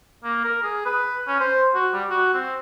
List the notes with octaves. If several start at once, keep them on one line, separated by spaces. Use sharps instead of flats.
A#3
A#4
G#4
B4
C#4
C5
F#4
G3
F#4
C4